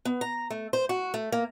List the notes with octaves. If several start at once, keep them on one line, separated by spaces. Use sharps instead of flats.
B3
A#5
A3
C5
F#4
A3
A#3